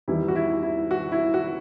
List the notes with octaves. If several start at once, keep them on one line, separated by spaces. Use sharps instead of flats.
E2 D#3 G3 E4
F#4
E4
E4
F#4
E4
F#4